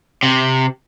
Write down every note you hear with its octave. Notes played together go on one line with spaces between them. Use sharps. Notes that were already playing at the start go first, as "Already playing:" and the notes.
C3